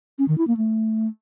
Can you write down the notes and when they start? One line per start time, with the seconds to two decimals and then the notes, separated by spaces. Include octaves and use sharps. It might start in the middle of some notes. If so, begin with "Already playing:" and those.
0.19 C#4
0.28 D#3
0.38 E4
0.48 A#3
0.57 A3